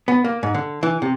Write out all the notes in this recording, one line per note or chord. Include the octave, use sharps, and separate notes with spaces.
B3
A#3
G#2
D3
E3
C3